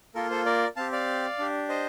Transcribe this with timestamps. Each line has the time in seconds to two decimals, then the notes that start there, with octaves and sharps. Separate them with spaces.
0.15 A#3 F4 A4 A#4
0.31 A4 C5
0.46 A#4 D5
0.76 C4 G4 F5 A5
0.92 D5 F5
1.38 D4 G4
1.69 C5 D#5